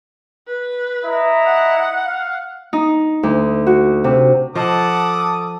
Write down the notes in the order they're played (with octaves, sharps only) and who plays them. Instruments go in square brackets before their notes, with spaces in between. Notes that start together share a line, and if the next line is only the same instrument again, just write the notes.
[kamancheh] B4
[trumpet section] E4 D#5 A#5
[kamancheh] F#5
[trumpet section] F5
[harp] D#4
D2
F#4
C3
[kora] F3 D#5 [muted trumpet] A4 [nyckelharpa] F#5 A5 [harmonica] D6 D#6